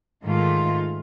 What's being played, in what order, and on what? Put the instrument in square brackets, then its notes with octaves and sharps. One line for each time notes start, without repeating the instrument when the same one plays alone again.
[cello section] G#2 D#3 A3 F4